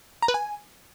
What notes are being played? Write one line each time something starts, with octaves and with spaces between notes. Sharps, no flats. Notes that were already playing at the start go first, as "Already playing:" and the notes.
A#5
B4
G#5